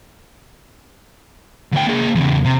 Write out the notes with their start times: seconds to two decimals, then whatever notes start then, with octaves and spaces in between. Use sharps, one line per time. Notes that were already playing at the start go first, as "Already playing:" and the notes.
1.73 D2 G5
1.87 A#3 G#4
2.15 E2 C#3
2.45 C3